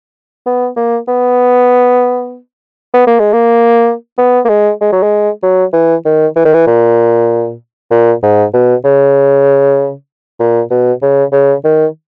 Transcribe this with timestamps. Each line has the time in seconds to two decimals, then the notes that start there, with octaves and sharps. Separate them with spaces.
0.46 B3
0.76 A#3
1.08 B3
2.94 B3
3.07 A#3
3.20 G#3
3.33 A#3
4.18 B3
4.45 A#3
4.49 G#3
4.81 G#3
4.92 F#3
5.02 G#3
5.43 F#3
5.73 E3
6.05 D#3
6.36 E3
6.45 D#3
6.54 E3
6.67 A#2
7.91 A#2
8.23 G#2
8.53 B2
8.84 C#3
10.40 A#2
10.71 B2
11.02 C#3
11.32 C#3
11.64 D#3